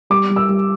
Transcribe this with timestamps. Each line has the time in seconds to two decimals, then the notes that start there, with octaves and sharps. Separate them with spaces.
0.10 G3 D6
0.30 G3
0.36 E6
0.49 G3